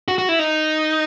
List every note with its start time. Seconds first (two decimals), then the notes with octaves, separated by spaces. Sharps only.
0.08 F#4
0.18 F#4
0.29 E4
0.39 D#4